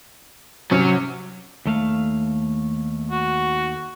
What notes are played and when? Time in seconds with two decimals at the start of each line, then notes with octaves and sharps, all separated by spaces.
0.71 C3 F#3 C#4
1.66 D#2 A3 F5
3.11 F#4